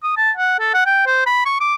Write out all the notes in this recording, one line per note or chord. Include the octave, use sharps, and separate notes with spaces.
D#6
A5
F#5
A4
F#5
G5
C5
B5
C#6
D6